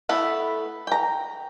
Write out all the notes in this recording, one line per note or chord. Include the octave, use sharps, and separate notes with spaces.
A3 B3 E4 A4
G5 A#5